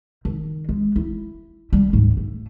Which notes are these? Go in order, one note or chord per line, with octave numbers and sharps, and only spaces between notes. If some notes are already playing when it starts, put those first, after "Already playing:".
D#3
G#3
E4
G3
D2 G#2
A3